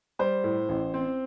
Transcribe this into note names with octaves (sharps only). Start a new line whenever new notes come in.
G3 C5
A2
A1
C4